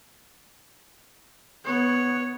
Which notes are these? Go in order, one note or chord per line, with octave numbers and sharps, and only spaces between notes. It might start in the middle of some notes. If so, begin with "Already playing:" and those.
B3 C#5